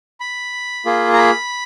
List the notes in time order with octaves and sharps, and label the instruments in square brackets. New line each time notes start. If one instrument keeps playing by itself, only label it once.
[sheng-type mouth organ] B5
A#3 F4 G#4
A#5
B5